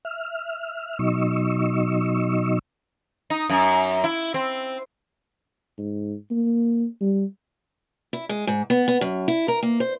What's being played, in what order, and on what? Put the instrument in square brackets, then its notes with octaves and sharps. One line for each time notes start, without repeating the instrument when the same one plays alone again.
[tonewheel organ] E5 F6
B2 F#3 D#4 D#5 C#6 E6
[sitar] D#4
F#2
E4
C4
[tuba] G#2
A#3
G3
[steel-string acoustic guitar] E4
G#3
G#2
B3
B3
F#2
E4
A#4
A#3
C5